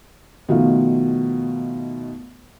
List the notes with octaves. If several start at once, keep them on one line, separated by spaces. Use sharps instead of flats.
B2 D#3 F3 A3 F5